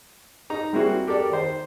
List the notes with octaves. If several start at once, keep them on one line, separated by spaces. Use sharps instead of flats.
D#4 A#5
G3 A#3 C4 E4 F#4 G#4
G4 A4 A#4 D5
D#3 C5